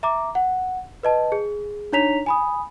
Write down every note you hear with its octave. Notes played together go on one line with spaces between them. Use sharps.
E5 A#5 D6
F#5
B4 D#5 A5
G#4
D4 D#4 C#5 A#5 B6 F7
G#5 B5 D#6